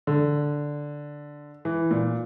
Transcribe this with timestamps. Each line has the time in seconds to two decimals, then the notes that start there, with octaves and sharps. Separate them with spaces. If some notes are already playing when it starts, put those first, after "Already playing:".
0.07 D3
1.65 E3
1.91 A#2